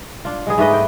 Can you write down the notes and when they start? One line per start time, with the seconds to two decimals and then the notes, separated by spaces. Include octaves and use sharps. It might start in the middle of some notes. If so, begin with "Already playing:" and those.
0.25 D4 F4
0.47 G#3 B3 G#4
0.58 G#2 A3 B4 D#5
0.73 G5